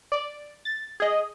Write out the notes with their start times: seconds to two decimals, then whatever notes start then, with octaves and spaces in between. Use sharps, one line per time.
0.12 D5
0.65 A6
1.00 G#4 D#5